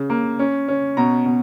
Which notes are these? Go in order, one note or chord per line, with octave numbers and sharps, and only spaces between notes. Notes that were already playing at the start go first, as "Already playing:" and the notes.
Already playing: C#3
A#3
C#4
C#4
B2 A#5
B2